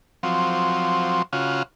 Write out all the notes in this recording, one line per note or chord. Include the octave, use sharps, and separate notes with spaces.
F3 F#3 C4
C#3 F4 F#4